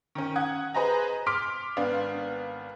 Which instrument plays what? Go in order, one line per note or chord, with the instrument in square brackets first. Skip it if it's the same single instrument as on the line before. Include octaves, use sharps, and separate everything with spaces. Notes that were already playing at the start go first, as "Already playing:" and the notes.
[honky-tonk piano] D#3 C#4
F#5 D#6 G#6
G#4 B4 C5 D#5 G#5 A#5
C6 D6 F6 B6 D7
G#1 B3 D4 F5